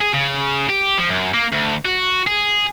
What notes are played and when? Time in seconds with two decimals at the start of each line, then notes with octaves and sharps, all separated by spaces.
0.01 G#4
0.14 C#3
0.69 G4
0.98 F3
1.09 F#2
1.34 A#3
1.53 D2
1.85 F#4
2.27 G#4